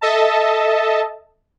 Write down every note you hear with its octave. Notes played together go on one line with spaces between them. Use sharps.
A4 D#5 E5 A5